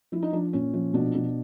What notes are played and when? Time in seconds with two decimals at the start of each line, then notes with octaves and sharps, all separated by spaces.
0.12 F3 E4
0.22 D#4
0.33 F3 D4
0.53 A#2 C#4
0.74 F3
0.94 B2 D4
1.15 B2